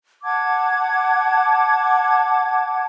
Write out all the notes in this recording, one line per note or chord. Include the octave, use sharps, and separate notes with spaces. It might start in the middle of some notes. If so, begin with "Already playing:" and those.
F#5 A5 D6 G#6